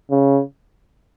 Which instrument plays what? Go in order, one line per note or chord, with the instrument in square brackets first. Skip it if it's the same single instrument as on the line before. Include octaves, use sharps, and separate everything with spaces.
[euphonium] C#3